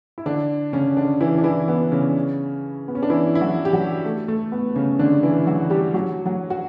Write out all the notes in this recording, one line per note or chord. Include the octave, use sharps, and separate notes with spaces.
E4
D3 D4
C#3 C#4
D3 D4
E3 E4
D4
E3 E4
B3
C#3 C#4
B3
C#4
D4
E3 E4
E4
F#3 F#4
G4
F#3 F#4
A3
A3
B3
C#3 C#4
D3 D4
E3 E4
F#3 F#4
G3 G4
F#3 F#4
F#3 F#4
F#4